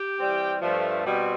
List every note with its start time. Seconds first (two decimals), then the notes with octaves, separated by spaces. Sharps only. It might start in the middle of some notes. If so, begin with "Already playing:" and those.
Already playing: G4 G5
0.20 E3 G3 C4
0.62 G2 F3 A3
1.06 B2 G3 C4